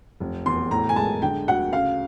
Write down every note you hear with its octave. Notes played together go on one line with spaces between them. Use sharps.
F1
E2 C6
A2 A#5
G#5
G#3 A5
D3 G5
D2 F#5
C#3 F5